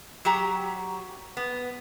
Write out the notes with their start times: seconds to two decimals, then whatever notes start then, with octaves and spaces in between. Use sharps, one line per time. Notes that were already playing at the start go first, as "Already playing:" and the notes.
0.25 F#3 F#4 G4 A#5
1.37 B3